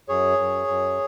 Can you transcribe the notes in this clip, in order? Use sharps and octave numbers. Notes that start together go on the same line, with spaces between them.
F#2 G#4 C#5
F#2
F#2